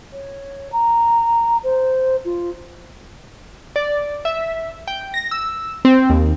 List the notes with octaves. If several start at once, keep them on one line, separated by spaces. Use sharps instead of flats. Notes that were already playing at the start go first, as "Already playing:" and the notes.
C#5
A#5
C5
F4
D5
E5
G5
A#6
E6
C4
D#2